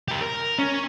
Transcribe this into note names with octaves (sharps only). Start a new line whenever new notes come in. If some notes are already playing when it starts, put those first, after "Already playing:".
G4 A#4
A#4
C#4